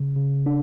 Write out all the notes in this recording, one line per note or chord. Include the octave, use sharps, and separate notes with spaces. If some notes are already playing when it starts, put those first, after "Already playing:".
Already playing: C#3
C#3
D4